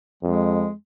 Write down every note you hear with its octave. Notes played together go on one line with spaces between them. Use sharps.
F2 G#3